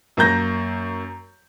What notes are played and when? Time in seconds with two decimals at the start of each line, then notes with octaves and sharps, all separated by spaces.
0.17 F#2 A#3 A#5 G6 A#6